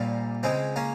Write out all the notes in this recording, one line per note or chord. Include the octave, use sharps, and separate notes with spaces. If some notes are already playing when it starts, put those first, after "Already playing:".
Already playing: A#1 A#2 G3 A#3 C#4
C#2 C#3 G#3 C4
A#3 C#4